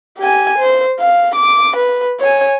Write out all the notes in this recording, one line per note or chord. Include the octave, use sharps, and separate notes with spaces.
G4 G#5
C5
F5
D6
B4
C#5 G#5